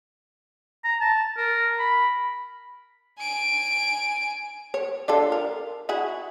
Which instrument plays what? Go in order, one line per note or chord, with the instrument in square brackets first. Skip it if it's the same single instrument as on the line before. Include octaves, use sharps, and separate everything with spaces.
[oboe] A#5
A5
A#4
B5
[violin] G#5 D7
[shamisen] C#5
D4 F4 A4
A#4
E4 F#4 G#4